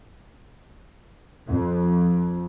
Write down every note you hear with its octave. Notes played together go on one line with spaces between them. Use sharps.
F2